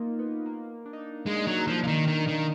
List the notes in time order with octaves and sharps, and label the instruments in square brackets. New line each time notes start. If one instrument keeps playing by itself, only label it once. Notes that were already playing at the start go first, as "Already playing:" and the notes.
Already playing: [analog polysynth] A#3 D#4 F4
B3
A#3
D4
D#4
D4
[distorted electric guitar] G#3
F#3
F3
F3
D#3
D#3
D#3